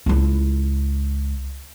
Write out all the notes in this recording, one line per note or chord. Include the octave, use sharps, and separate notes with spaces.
C#2 E4